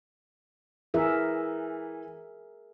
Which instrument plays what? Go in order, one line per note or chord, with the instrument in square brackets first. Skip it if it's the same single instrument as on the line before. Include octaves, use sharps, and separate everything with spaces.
[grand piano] E3 [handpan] G#4 A#4 E5